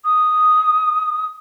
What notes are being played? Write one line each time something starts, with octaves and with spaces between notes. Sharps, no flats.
D#6